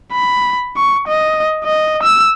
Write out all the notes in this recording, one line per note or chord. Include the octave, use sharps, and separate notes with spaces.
B5
C#6
D#5
D#5
E6